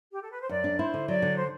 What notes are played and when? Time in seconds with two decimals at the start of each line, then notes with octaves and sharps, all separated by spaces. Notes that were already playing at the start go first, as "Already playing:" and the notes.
0.12 G4
0.22 A4
0.31 B4
0.41 C5
0.49 F#2 D5
0.64 D4
0.79 E4 C5
0.94 D3
1.08 F#3 D5
1.22 D3
1.37 C5